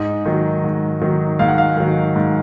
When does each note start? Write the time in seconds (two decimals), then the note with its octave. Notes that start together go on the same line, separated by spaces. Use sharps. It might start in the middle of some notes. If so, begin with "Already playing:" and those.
Already playing: G#2 D#5
0.26 D#3 F#3
0.63 G#2
1.01 D#3 F#3
1.39 G#2 F5
1.48 F#5
1.58 F5
1.77 D#3 F#3
2.16 G#2